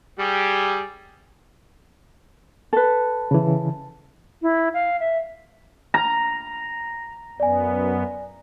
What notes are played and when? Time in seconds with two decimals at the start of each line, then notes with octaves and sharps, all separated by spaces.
0.19 G3 G4 G#4
2.73 A4 B4
3.31 C#3 E3
4.42 E4
4.74 F5
5.00 E5
5.94 A#5
7.40 F#2 B3 D5 G#5